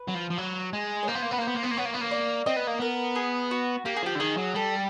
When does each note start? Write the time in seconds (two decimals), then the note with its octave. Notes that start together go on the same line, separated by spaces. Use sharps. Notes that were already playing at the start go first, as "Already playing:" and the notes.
Already playing: B4
0.08 F#3
0.15 F3
0.30 F3
0.38 F#3
0.73 G#3
1.03 C#5
1.07 A#3 C5
1.15 B3
1.22 A#3
1.31 B3 B4
1.38 A#3
1.42 C5
1.47 B3
1.54 A#3
1.63 B3
1.71 A#3
1.77 B3 C#5
1.85 A#3
1.94 B3
2.01 A#3
2.11 D5
2.46 C4 D#5
2.57 B3
2.67 A#3
2.79 B3 A#4
3.15 G#4
3.51 F#4
3.85 A#3 G4
3.96 G#4
4.03 F3 G4
4.16 D3
4.20 D#3 G#4
4.38 F#3
4.55 G3 A4